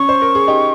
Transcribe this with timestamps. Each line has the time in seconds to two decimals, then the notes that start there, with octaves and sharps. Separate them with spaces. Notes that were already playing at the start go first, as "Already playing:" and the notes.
Already playing: C#4 C#6
0.09 C5
0.22 A#4
0.35 G#4
0.48 D#4 G4